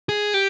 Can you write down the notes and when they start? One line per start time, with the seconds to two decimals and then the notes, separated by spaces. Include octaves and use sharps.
0.09 G#4
0.34 G4